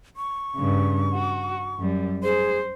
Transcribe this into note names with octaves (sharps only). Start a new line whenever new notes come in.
C#6
G2 C#3
F#4
F#2 G3
G#4 C5